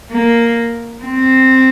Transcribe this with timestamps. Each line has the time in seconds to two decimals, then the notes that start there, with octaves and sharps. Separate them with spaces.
0.11 A#3
1.04 C4